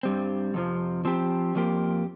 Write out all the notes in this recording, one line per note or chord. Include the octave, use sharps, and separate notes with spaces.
G2 G3 C4
F2 C3 F3
F3 C4 G4
F2 F3 A#3 G4